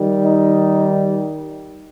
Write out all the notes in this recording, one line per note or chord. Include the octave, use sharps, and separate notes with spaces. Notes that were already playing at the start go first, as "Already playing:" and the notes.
Already playing: D#3 G3
D#4